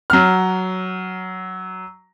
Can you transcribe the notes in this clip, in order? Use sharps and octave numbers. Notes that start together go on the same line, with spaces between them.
F#3 F6